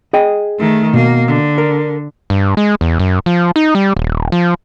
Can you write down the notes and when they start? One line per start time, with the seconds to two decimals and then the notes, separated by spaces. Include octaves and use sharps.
0.13 G#4 D#5 G5
0.58 D#3 A3
0.93 B2 A#3
1.27 D3
1.58 A#4
2.30 G2
2.57 G#3
2.81 E2
2.99 F#2
3.26 F3
3.56 D#4
3.75 G3
3.96 D#1
4.32 F3